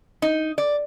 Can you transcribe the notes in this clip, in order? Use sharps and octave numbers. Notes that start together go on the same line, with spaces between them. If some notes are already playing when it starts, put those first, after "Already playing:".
D#4
D5